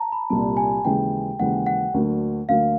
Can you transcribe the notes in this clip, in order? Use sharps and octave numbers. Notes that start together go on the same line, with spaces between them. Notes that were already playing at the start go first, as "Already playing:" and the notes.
Already playing: A5 A#5
B5
C2 A#2 G3 A5
G#5
D#2 C#3 E3 G#3 G5
D#2 C#3 E3 G#3 F#5
F#5
D2 D3 F#3 A#3
D2 D3 F#3 A#3 F5